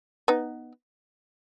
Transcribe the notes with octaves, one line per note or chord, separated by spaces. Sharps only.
B3 D#4